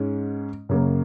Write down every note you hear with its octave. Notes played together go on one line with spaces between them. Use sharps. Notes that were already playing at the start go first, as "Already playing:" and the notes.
Already playing: G#2 G#3 C#4
F#2 C#3 A#3